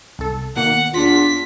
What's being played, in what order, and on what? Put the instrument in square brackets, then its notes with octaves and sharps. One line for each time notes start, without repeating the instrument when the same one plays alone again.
[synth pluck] C2 A4
[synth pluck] B2 D#3 A#3 [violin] F#5
[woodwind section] E2 D4 F4 [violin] B6